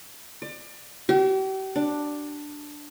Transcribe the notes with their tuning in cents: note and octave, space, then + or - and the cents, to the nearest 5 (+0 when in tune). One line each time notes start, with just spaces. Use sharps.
D5 +30
G4 -40
D4 +5